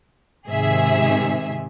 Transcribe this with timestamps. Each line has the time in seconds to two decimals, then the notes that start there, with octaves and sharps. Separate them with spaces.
0.47 G#2 C3 D#3 G#4 E5